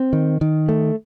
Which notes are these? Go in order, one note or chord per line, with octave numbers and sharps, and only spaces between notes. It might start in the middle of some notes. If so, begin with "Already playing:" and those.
Already playing: C4
D#3
D#3
A3